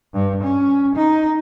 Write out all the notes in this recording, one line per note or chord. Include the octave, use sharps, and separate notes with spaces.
G2
C#4
D#4